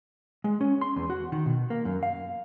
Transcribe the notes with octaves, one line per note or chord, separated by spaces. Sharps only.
G#3
C#4
C6
E2
F#4
D#3
B2
A#3
F#2
F5